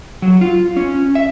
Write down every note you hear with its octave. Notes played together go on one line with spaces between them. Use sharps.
F#3
F4
C#4
E5